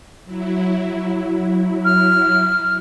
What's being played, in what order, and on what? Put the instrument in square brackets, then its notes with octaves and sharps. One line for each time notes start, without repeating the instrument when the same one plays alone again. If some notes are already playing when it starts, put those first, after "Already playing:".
[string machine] F#3 E4
[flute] F6